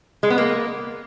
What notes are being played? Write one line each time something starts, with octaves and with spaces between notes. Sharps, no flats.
G#3
B3
A#3